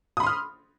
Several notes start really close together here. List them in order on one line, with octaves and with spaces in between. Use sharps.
D#6 B5 C6 F6